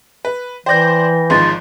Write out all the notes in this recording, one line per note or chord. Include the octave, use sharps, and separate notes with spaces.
B4
E3 C5 D5 G5 G6 A#6
G#1 G#2 F3 C6 A6